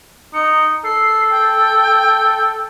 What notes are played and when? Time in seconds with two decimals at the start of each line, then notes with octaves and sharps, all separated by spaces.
0.34 D#4 C#7
0.84 A4 C7
1.30 G5